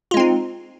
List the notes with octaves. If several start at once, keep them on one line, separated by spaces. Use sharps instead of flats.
G#3 C4 D#4 F4